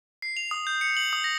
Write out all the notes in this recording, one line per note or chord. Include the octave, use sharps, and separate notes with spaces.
C7
F7
D#6
G6
C#7
F#7
D#6
A#6